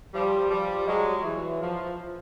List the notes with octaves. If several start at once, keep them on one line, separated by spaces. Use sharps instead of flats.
F3 G3
F3 G3
F#3 G#3
E3
F3